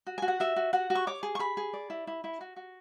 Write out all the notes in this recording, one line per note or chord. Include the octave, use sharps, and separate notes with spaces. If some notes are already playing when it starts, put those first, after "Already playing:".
F#4
F#4 G#5
F#5
F#4 E5
F#4
F#4 F#5
F#4
C#6
C#5 D6
G#4
C#6
G#4 B5
G#4
D5
E4
E4
E4
F#4
F#4